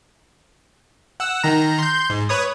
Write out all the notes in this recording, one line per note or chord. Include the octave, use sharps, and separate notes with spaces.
F#5 E6
D#3 A#5
C6 G6
G#2
B4 C#5 D#6